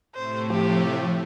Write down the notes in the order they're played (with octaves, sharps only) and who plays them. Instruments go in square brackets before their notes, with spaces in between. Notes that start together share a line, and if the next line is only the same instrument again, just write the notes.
[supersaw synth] A2 C3 A3 [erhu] C5
[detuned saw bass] F3 [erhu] G4